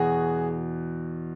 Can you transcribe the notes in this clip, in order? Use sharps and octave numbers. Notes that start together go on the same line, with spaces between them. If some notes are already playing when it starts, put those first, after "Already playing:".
Already playing: E2 B2 F#4 G#4